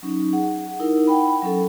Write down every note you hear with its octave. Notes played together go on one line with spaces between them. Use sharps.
F#3 C#4 D#4
G#4 F#5
D#4 E4 A#4
F#5 G5 B5
F#3 C#4 A4